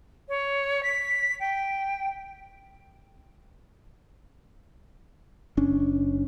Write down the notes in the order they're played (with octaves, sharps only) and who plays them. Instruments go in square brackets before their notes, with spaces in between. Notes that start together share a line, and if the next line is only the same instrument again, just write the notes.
[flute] C#5
B6
G5
[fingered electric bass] F#1 C#4 D4